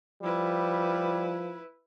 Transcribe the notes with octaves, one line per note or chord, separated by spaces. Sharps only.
F3 G3 E4 B4